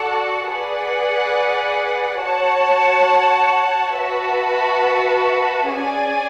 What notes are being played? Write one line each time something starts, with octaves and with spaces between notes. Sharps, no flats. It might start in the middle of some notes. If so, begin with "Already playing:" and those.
Already playing: F#4 A4 D5 F#5 A5
G#4 B4 D5 F#5
F#4 C#5 F#5 A5
F#4 B4 E5 A5
C#4 G#4 D5 G#5